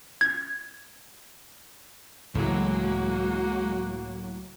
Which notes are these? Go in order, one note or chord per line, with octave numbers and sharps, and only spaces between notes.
G#6
C#2 A2 E3 F#3 G#3 A#3 F#4